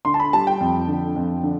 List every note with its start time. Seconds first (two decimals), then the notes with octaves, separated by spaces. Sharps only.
0.05 D3 C6
0.14 A5
0.20 B5
0.33 G3 A5
0.47 G5
0.61 F2
0.88 D3
1.16 F2
1.43 D3